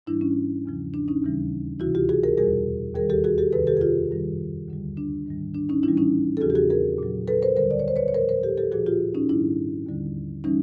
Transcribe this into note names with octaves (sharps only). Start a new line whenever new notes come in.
G#2 E3 G3 D4 E4
C#4
E2 C#3 F3
D4
C#4 D#4
D#2 C#3 E3 G3
D2 C3 E3 E4 F#4
F4 G4
F#4 G#4
G#4 A#4
E2 B2 G3 G#4 A#4
D#2 D#3 G3 G#4 A#4
G4 A4
F#4 G#4
G4 A4
F2 C3 D#3 A4 B4
G4 A4
G#4
F4 G4
F#2 D#3 G3
D2 D3 G3
D4
G#2 D#3 G3
D4
C#4 D#4
A2 E3 G3 D4 E4
C#4 D#4
A4
E2 C#3 F3 F#4 G#4
G4
F#4 G#4
G#4 A#4
A#2 F#3
A4 B4
A#4 C5
D2 D3 G3 A#4 C5
D5
C#5
C5
B4 C#5
C#5
A2 F3 A#4 C5
A#4 C5
G4 A4
G4 A4
A#2 F3 F#4 G#4
F4 G4
C#4 D#4
G#2 D#3 G3 D4 E4
D#2 D3 G3
E3 G3 C#4 D#4